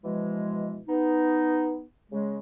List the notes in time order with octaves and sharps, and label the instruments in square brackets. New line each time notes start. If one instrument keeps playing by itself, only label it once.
[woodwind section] B2 E3 F3 G#3
B3 D#4
C#3 G#3